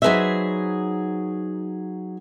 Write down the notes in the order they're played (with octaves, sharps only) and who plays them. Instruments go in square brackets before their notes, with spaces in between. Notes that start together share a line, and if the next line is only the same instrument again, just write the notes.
[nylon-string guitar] F#3 D#4 G#4 B4 C5 E5